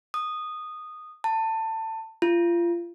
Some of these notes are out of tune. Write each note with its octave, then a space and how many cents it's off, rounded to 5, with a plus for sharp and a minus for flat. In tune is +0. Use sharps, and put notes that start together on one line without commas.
D#6 -10
A5 +20
F4 -30